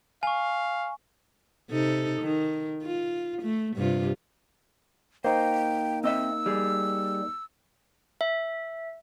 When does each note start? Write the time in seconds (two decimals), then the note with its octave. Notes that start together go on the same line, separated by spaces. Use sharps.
0.23 F5 G#5 C#6
1.70 C3 D#4 A4
2.21 D#3
2.83 F4
3.43 A3
3.77 G2 C3 F4
5.24 A#3 D#4 C5 G5
6.04 C4 D#5 E5 E6
6.46 G3 G#4
8.21 E5